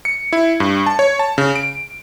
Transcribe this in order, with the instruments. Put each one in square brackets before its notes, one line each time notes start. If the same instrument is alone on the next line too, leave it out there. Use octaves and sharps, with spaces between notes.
[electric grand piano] C#7
E4
G2
A5
C#5
A5
C#3
D7